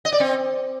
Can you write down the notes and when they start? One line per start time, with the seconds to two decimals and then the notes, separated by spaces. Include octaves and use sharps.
0.05 D#5
0.12 D5
0.20 C4